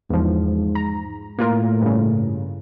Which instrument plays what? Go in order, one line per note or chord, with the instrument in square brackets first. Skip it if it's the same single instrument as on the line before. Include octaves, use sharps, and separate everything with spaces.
[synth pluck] E2 F3 [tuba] G#2
[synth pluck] A#5
[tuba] A2 [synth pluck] A#3 F4 A#4
[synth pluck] G2 C#3